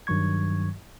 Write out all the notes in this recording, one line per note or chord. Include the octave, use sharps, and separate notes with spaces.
G2 D#3 F#3 C#6 G#6